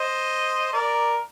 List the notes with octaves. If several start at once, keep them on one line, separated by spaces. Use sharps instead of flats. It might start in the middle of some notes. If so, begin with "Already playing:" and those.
Already playing: C5 D#5
A#4 D5